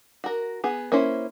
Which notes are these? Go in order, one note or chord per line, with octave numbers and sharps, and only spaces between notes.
F#4 A#4
B3 G#4
A#3 C#4 E4 C5